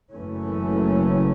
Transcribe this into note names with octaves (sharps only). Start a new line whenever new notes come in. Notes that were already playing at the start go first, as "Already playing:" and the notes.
F#1 F#2 E3 A3 C#4